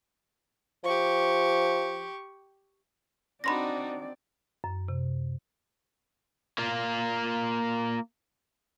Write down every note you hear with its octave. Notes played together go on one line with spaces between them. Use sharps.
F3 G4 C#6
C4 D4 D#4 F#4 D5 B5 C6 A#6
F#2
C3
A#3 F4